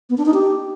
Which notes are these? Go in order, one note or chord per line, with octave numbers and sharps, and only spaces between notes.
B3
D4
D#4
G4